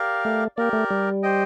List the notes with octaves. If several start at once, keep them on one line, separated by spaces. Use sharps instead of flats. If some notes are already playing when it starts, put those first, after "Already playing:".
Already playing: G4 A#4 D5 F5
A3
A#3 G4 A#4 D5
A3
G3
G4 C5 D#5 G5